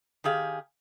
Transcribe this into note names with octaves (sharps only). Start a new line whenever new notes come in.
D#3 G4 G#4 F5